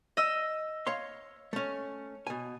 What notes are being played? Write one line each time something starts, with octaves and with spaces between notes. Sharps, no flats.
D#5 E6
C#5 F5 C6
A3 C#4
B2 G#5